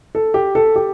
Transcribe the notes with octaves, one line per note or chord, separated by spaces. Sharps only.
A4
G4
A4
G4